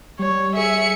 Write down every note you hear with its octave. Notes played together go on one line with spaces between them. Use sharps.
G3 C#5
G#4 E5 C#7